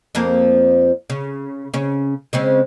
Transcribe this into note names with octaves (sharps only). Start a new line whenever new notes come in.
F2 F3 A#3
C#3
C#3 C#4
C#3 G#3 C4